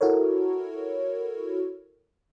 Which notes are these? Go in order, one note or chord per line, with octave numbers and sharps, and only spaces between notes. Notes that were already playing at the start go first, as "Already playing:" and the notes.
E4 F#4 A4 A#4 C#5